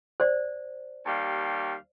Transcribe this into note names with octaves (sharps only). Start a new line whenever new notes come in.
C5 D5
D#2 G3 F5